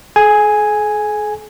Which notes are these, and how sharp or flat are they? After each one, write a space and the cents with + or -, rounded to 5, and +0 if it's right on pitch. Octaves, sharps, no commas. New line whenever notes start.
G#4 +45 G#5 +0